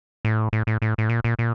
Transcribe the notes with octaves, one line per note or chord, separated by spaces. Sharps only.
A2
A2
A2
A2
A2
A#2
A#2
A#2